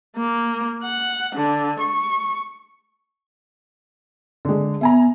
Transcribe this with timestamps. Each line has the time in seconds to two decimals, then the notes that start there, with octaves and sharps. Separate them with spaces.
0.16 A#3
0.84 F#5
1.36 D3
1.80 C#6
4.45 D3 G#3
4.81 B3 E5 G#5 A#5